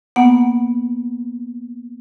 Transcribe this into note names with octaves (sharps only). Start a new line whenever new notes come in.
A#3 B3 F#5